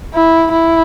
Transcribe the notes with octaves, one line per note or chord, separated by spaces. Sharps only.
E4
E4